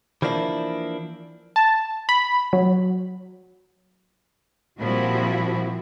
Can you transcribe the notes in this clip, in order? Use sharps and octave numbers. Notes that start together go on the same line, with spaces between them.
E3 F3 A#3 D4 E4
A5
B5
F#3
A#2 F3 G3 C4 E4 F#4